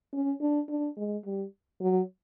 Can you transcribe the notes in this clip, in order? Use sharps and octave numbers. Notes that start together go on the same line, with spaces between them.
C#4
D4
D4
G#3
G3
F#3